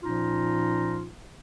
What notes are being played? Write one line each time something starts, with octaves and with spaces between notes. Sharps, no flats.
A#2 F3 C#4 D#4 F4